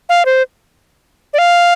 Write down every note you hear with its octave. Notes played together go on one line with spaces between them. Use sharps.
F5
C5
D5
F5